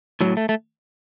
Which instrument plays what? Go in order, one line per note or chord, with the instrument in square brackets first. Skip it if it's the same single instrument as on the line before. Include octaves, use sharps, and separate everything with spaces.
[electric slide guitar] A2 F#3
A3
A3